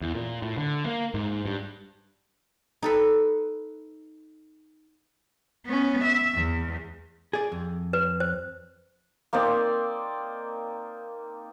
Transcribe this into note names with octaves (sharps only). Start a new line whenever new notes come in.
E2
A#2
A2
D3
A#3
G#2
G2
D#4 A4 B4
B3 C#4
E5
E2
G#4 D5
F2
B4
C5
A#3 C4 D#4 D5